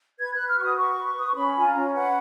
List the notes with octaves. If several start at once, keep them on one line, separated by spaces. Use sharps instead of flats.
B4 G#6
B4 F#6
F6
F#4 C#6
D#6
B4 C#6
B4
B4 D#6
C#6
C#4 B5
F4 G#5
A#5
C#4
B4 F#5